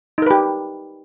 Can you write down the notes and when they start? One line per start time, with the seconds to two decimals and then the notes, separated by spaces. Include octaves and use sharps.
0.18 D#4
0.22 A#4
0.26 B4
0.31 G4